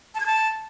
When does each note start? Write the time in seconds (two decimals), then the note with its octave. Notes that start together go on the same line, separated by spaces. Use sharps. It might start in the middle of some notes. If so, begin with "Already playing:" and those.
0.15 A5
0.20 G#6
0.26 A5